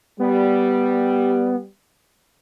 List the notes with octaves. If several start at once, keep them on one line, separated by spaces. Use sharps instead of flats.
G3 B3